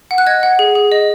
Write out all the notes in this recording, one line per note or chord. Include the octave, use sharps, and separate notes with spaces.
F#5
F#6
D#5 G#6
F#5
G#4
G#4
D#5